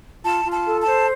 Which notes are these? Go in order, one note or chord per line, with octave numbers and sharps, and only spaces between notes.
F4 A5
F4
A5
A4
A5
C5